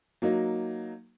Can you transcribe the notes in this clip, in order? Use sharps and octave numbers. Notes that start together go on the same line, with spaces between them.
F#3 A#3 D#4